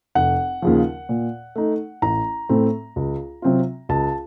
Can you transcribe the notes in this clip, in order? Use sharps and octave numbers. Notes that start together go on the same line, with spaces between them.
F1 F#5
D#2 C#3 F3
A#2
A3 D#4
A1 A#5
A2 A3 C4
C#2
C3 F#3 C4 F4
C#2 A5